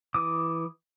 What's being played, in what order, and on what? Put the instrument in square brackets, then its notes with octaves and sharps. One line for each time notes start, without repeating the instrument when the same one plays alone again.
[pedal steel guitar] E3 D6 D#6